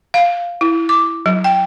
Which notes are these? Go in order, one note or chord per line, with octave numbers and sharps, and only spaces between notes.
F5
E4
D6
F#3
G5